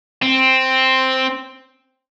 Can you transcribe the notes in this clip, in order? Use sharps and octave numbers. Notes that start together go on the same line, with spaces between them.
C4